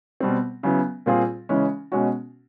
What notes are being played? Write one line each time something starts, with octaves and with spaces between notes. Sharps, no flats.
B2 G3 C4
C#3 F#3 B3 E4
A#2 G3 C4 F4 G#4
C#3 E3 G#3 C#4
B2 G#3 C#4 F#4